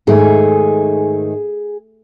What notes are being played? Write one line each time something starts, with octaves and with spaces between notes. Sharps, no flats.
G#2 D#3 A3 D#4 G#4